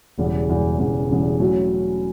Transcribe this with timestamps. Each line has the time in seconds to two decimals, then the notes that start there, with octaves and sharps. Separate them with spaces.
0.18 E1 E2 C#3 E3 G3
0.48 E1 E2 C#3 E3 G3
0.79 E1 E2 C#3 E3 G3
1.10 E1 E2 C#3 E3 G3
1.40 A2 F#3 C#4 F#4